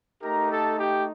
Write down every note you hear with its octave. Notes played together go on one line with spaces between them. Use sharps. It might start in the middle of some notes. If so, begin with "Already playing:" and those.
A3 D#4 G4 A#4 A#5
A4 A5
G4 G5